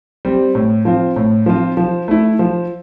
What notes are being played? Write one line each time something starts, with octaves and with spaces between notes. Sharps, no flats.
G3 C4
A2
F3 C4 F4
A2
F3 C4 F4
F3
A3 E4
F3